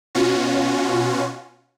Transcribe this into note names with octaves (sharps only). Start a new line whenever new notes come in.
B2 C#4 F4 F#4